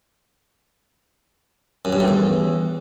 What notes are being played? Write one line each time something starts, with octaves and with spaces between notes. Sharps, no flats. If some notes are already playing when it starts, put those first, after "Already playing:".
F#2
G2
A2
E2